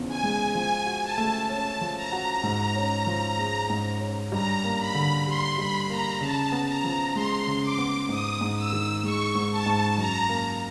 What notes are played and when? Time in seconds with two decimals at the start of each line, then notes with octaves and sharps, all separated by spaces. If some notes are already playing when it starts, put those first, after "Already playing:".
Already playing: E2 C#3 F3
0.09 G#5
0.23 G#3
0.55 F3 G#5
0.86 F#4
1.03 A5
1.18 A3
1.49 C#4 A5
1.81 F3
1.96 A#5
2.12 F#4
2.43 G#2
2.75 C#4
3.07 F3
3.38 G#3
3.70 G#2
4.01 C#4
4.32 G2 A#5
4.64 A#3
4.80 B5
4.95 D3
5.26 G3 C6
5.58 G2 B5
5.90 A#3 A#5
6.21 C#3 A5
6.52 B3
6.68 A#5
6.84 F3
7.15 G#3 C6
7.47 C#3
7.63 D6
7.78 B3
8.09 G#2 D#6
8.41 G#2
8.57 E6
8.72 D#3
9.04 G#3 C#6
9.35 G#2
9.51 A5
9.66 G#2
9.98 F#2 A#5
10.29 A#3